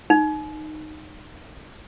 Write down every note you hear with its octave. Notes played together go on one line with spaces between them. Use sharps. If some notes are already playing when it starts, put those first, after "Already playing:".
D#4